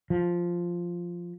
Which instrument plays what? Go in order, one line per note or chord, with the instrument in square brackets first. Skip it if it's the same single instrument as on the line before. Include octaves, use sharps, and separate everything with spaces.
[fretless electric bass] F3